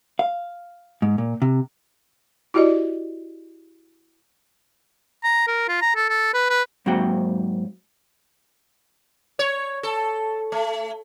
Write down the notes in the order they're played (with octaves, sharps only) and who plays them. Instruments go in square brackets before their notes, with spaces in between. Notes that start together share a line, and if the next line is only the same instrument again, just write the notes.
[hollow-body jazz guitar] F5
G#2
A#2
C3
[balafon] E4 F#4 G4 D5 D#5
[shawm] A#5
A#4
F4
A#5
A4
A4
B4
B4
[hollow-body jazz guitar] G#2 F#3 A#3 C4 F#4 G5
[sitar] C#5
A4
A3